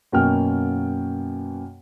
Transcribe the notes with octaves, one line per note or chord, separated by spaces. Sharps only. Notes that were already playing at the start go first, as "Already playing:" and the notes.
F#2 B2 A#3 F#4 G5 F6